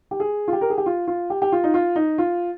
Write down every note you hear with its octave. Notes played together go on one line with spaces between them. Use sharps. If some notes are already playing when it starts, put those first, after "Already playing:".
G4
G#4
F4
G4
A#4
G#4
G4
F4
F4
G4
G4
F4
D#4
F4
D#4
F4